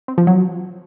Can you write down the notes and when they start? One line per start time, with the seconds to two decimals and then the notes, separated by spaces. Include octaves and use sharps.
0.08 C4
0.18 F3
0.27 F#3